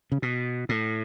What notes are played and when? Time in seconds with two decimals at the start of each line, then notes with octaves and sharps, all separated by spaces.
0.12 C#3
0.22 B2
0.69 A2